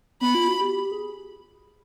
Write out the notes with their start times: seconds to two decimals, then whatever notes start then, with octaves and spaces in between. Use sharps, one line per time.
0.21 B3 B5
0.35 F4
0.48 F#4
0.61 G4
0.74 G4
0.92 G#4